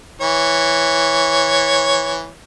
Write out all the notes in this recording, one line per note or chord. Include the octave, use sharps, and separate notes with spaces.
E3 C#5